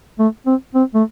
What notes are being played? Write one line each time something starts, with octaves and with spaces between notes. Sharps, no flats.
A3
C4
C4
A3